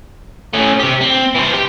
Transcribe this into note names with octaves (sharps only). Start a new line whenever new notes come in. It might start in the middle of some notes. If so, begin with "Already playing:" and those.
A3 C#4
C4 G4
C4
E3 C5
G4